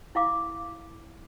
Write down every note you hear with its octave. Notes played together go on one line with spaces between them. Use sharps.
E4 F5 D6